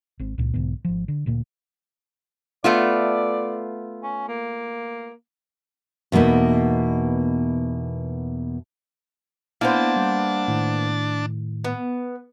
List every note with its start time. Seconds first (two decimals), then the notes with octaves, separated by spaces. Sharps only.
0.19 G#1 G#2 C4
0.38 C#2 A#2
0.54 B1 G#2 D3 B3
0.85 G#1 F3
1.08 D3
1.26 D2 A#2 A3 A#3
2.64 A3 B3 F4 D5
4.03 C#4
4.28 A#3
6.12 E2 B2 A3 A#3 D#4
9.61 A#3 B3 D4 E4 C5 A5
9.96 G3
10.48 A2 D#3
11.64 B3